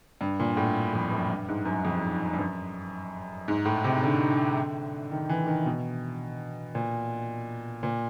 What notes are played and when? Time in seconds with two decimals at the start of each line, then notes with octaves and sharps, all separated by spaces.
0.21 G2
0.40 A#2
0.57 A2
0.93 F2
1.11 F#2
1.30 G2
1.49 G#2
1.66 F#2
1.85 F2
2.33 G2
2.39 F#2
3.48 G#2
3.65 A2
3.84 C3
4.03 D3
5.11 D#3
5.29 E3
5.47 D#3
5.66 B2
6.75 A#2
7.83 A#2